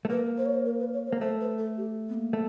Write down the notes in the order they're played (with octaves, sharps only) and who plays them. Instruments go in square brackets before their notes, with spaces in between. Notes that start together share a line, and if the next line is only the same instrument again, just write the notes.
[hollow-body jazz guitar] A3
[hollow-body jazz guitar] A#3 [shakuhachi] B4
[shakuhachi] C5
C#5
C5
A#4
B4
C#5
C5
[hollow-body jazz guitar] A#3
[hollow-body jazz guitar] A3 [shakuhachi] C5
[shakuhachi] B4
A4
G4
B3
A#3
[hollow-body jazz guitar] A3